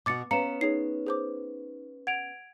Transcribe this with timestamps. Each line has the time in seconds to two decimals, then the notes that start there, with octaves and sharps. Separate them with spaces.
0.06 B2 F#4 D6 A6 C#7
0.31 B3 C#4 F5 A#5 C#7 E7
0.61 D#4 G#4 C#5 C7
1.07 G#4 C5 D6
2.07 F#5 G#6 D7 F7